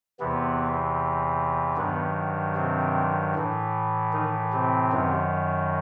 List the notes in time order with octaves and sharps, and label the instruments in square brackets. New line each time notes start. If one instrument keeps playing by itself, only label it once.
[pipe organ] E2 C3 E3 B3
G2 D#3 F#3 B3
C3 C4
A2 E3
D#3 D#4
C3 C4
F#2 D#3 F#3